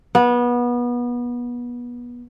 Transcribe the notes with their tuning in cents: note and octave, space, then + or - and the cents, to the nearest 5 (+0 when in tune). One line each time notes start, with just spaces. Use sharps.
B3 -25